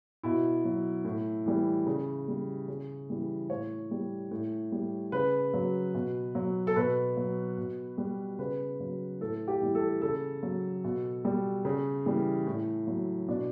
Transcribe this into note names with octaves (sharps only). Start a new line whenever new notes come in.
B2 E4
F#3
A2
E3 G3
C#3
G3
C#3
E3 G3
A2 C#5
G3
A2
G3
C#3 B4
F#3
B2
F#3
A4
B2 B4
F#3
B2
G3
C#3 B4
F#3
A2 A4
G4
E3 G3
A4
C#3 A4
F#3
B2
G3
C#3
E3 G3
A2
F#3
B2 D4